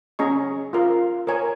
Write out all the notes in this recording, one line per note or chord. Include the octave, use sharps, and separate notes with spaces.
C#4 G#4 D#5 A#5 C#6
F4 A#4 F5
A#4 C#5 G#5